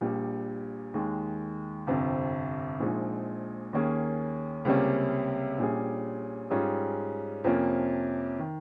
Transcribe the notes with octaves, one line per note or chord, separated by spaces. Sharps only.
A#1 A#2 G3
D#2 D#3 G#3
G1 F2 C3
A#1 A#2 F3 G#3 D#4
D#2 D#3 A#3 C#4 G#4
C#2 C3 G3 A#3 C#4
A#1 A#2 G3 C#4 G#4
G#2 G3 C#4 F4 G#4
F2 C3 F3 A#3 C#4
D#3